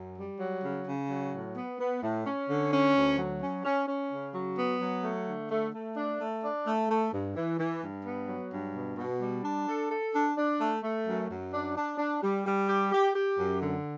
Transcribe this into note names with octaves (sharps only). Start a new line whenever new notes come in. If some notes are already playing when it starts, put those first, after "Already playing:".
Already playing: F#2
G3
F#3
C#3
C#3
F#3
A2
B3
B3
A2
C#4
D3
C#4
D2
F#3
C#4
C#4
C#4
C#3
F#3
B3
F#3
A3
D3
A3
A3
D4
A3
D4
A3
A3
G2
E3
E3
G2
B3
F#3
G2
B2
B2
G3
D4
A4
A4
D4
D4
A3
A3
F#2
F#2
D4
D4
D4
G3
G3
G4
G4
G4
F#2
D3